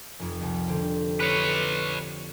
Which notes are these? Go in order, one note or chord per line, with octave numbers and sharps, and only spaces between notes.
F1 F2
C2 C3
D3 G4 C5
B4 C#5